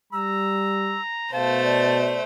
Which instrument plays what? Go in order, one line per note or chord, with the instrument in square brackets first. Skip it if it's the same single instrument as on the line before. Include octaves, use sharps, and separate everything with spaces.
[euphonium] G3 [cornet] A#5 [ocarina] E6
[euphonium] B2 [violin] A3 C5 [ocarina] F5 [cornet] A5
[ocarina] D5